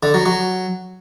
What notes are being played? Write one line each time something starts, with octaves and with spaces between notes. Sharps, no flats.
D3
F#3
F#3